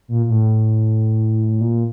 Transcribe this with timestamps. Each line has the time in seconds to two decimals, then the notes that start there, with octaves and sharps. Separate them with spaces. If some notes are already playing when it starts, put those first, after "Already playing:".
0.08 A#2
0.26 A#2
0.30 A2
1.61 A#2